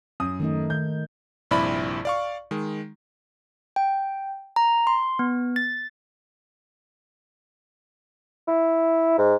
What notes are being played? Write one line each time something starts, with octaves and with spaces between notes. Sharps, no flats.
F#2 D#6
D#3 A3 D#4
D#3 G6
A#1 G2 C3 E4 D5 B5
D5 F5 C#6
D#3 G#3
G5
A#5
C6
B3
A6
E4
G#2